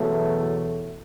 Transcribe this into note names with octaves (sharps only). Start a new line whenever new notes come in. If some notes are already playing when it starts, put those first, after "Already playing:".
Already playing: E2 B2 F#3 A3